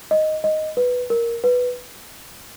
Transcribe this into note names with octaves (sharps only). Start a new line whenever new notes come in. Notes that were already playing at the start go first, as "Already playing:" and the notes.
D#5
D#5
B4
A#4
B4